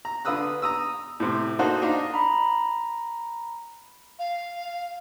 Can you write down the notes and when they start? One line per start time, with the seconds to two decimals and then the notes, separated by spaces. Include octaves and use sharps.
0.05 A#5
0.25 D3 F4 B4 D#6 E6 F#6
0.62 A#5 D#6 E6
1.20 A2 C3
1.59 A#3 D#4 F#4 A4 C5
1.82 D4 D#4 F5 A#5
2.14 A#5 B5
4.19 F5